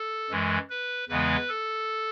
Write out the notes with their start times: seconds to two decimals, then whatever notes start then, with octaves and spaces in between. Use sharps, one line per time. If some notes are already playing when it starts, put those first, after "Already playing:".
Already playing: A4
0.30 F#2 E3 G#3
0.70 B4
1.09 E2 C#3 E3 G#3 B3 B4
1.49 A4